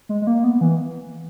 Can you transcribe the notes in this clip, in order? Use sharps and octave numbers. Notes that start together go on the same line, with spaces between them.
G#3
G#3
A#3
B3
E3